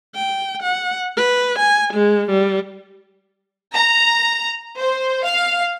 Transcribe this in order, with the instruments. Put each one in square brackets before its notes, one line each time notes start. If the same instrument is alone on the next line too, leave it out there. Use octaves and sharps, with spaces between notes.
[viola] G5
F#5
B4
G#5
G#3
G3
[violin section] A#5
C5
F5